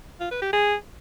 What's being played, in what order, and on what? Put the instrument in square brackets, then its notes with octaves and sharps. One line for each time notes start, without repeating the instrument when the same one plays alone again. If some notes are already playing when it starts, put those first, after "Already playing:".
[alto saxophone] F4
B4
G4
G#4